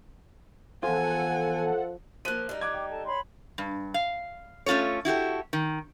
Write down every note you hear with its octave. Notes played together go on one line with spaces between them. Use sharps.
E2 F3 F4 A4 F#5 G#5
F3 A#3 F#6 D#7
G3 D#4
D6 F#6 G#6
G5 D6
A4 A5
C#5 B5 C6
G2
F5
A3 C#4 F4 A4 C#5
E4 F#4 G4 A4
D#3